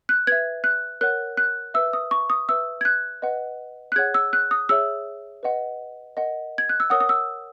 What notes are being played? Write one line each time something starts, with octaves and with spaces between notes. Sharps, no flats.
F#6
B4 E5 G#6
F#6
A#4 C#5 F#5 F#6
F#6
B4 E5 E6
D#6
C#6
D#6
B4 E5 E6
G#6
F#6
B4 D#5 F#5
F#6
G#4 C#5 F#5 G#6
E6
F#6
D#6
G#4 C#5 E5 E6
B4 D#5 F#5
A#4 D#5 F#5
G#6
F#6
E6
A#4 C#5 F#5 D#6
D#6
E6